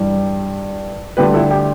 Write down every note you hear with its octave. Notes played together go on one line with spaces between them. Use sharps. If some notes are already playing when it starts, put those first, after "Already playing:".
Already playing: G2 E3 G3
D2 D3 G3 G4 B4
E4 A4
G4